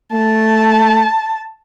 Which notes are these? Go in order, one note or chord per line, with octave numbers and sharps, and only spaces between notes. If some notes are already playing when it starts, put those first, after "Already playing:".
A3 A5